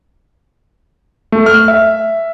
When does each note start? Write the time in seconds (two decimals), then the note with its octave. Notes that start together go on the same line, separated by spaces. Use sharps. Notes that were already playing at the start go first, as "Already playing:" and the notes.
1.32 A3
1.46 F6
1.68 E5